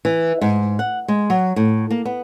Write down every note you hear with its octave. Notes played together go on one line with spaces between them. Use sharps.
E3
G#2
F#5
G#3
F#3
A2
A#3
B3